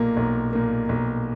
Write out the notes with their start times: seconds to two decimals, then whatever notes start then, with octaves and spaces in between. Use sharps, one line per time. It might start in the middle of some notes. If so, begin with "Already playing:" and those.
Already playing: B1 A#2 A#3
0.17 B1
0.53 A#2 A#3
0.89 B1